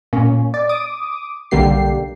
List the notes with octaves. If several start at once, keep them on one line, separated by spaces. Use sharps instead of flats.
A#2 A#3 C#4
D5
D6 D#6
B1 D3 G3 A#3 G4 C7